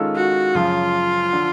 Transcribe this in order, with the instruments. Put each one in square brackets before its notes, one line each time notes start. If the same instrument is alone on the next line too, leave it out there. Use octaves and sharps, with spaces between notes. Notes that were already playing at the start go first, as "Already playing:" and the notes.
Already playing: [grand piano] D#3 G#3 C#4 F4 A4
[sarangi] F#4
[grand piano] F#2 C#3 F3 [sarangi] F4
[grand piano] D3 F3